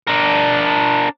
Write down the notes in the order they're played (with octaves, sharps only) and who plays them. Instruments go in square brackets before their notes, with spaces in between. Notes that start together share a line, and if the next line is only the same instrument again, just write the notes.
[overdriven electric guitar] D4 A#4